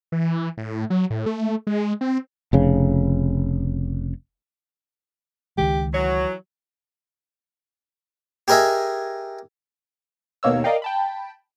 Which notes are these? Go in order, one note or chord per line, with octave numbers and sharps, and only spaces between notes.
E3
A2
F#3
A2
A3
G#3
C4
F1 C#3
C#2 D#3 G#3 G4
E3 F#3 C#5
G4 G#4 A#4 D#5 E5 G#5
D#2 B2 A#3 C#5 E6
A#4 D5 D#5 F5 G5
G5 A5 B5